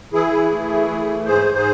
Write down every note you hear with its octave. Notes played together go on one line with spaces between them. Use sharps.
E3 E4 G#4
E3
A3
E3
A3
E3
G#2 G#4 C5
G#2
G#4 C5